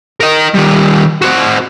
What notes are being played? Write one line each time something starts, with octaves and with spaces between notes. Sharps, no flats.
A#4 D#5
D#3 G3
C4 F#4